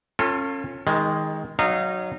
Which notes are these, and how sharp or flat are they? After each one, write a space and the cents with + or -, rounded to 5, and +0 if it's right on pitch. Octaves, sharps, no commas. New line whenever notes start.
C#4 -20 F4 +5 A4 +30
D#3 +20 G#3 -5
F#3 +0 D#4 -25 F5 -30